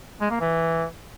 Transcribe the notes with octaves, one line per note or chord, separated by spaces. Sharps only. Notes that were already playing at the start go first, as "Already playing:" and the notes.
G#3
A#3
E3